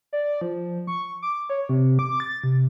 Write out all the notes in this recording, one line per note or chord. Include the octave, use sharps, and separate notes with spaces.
D5
F3
C#6
D6
C#5
C3
D6
A6
C3